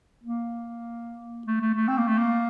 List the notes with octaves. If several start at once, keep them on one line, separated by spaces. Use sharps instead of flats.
A#3
A3
A3
A3
C4
A#3
A3
A#3